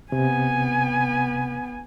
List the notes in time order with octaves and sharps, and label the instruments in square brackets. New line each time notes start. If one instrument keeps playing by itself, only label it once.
[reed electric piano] C3 [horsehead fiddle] B3 G#5